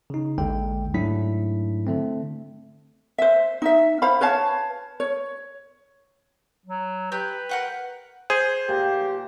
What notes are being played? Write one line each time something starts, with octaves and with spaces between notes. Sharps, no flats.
C#3 D#4
A1 D#2 D3 G#3 G5
G#2 F#3 A3 D4 E4 B6
D3 A3 C4
C5 E5
D#4 E5
C5 F5 B5
B4 C#5 F5 A5
C#5
F#3
G4 B4
A#4 F#5 G5
G#4 C5
A#2 G4